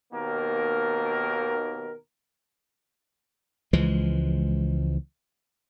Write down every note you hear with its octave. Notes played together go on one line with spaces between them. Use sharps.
D#2 B2 D#3 A#3 A#4
C#2 E3 F3 G#3